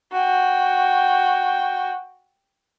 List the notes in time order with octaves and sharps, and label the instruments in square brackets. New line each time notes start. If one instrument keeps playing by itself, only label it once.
[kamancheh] F#4 G5